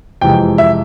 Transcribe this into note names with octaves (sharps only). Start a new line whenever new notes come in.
F2 C3 E3 G#3 G5
E5